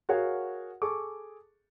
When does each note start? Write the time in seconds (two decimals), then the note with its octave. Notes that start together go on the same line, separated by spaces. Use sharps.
0.09 F#4 G#4 A#4 C#5 F5 F#5
0.82 G#4 A4 C#6 D6